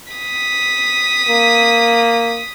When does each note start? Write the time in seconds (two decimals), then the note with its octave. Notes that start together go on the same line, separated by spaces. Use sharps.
0.13 D#6 B6
1.29 A#3